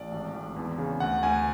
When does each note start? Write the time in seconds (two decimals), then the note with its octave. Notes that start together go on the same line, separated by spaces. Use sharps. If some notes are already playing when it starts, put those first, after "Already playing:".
Already playing: A1 D5
0.12 G#1
0.35 G#1
0.56 E2
0.78 C#3
1.00 D2 F#5
1.23 D2 G#5